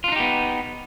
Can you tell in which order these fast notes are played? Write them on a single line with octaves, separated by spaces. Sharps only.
F4 D4 D#4 G4 B3